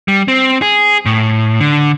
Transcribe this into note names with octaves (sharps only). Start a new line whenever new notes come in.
G3
C4
G#4
A2
D3